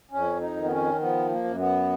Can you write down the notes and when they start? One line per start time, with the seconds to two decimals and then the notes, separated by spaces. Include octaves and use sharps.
0.11 F2 C#4
0.41 D#4
0.56 D#3
0.64 B3
0.70 C#4
1.00 F3 B3
1.30 A#3
1.44 F#2
1.59 B3